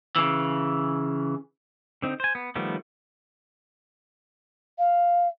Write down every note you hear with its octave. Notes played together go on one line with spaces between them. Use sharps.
C#3 E3
D3 C4 D#4
C5 G#5
B3
D#3 F3 G3 A3 B3
F5